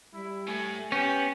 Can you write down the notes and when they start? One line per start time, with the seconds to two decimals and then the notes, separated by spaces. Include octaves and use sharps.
0.14 G3 E4
0.48 A2 A3 G#5
0.92 B3 C#4 G4